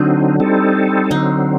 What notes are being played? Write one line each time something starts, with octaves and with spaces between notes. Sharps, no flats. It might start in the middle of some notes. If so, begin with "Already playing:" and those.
Already playing: D3 F#3 C4 D4 D#4 F#4
G3 C4 D#4 A4
D3 F#3 C4 D#4